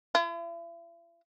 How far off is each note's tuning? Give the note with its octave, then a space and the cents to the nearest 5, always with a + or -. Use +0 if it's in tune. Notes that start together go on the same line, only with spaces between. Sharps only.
E4 +45